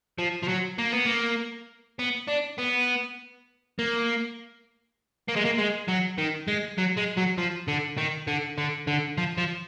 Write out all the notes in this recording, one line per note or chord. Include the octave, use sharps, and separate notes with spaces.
F3
F3
F#3
A#3
B3
A#3
B3
D4
B3
A#3
A#3
G#3
A#3
G#3
F#3
D#3
G#3
F#3
G#3
F#3
F3
D3
D#3
D3
D3
D3
F3
F3